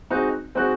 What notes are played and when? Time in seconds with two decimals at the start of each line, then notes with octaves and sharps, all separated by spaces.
0.10 G#3 C4 D#4 F#4
0.55 G#3 C4 D#4 F#4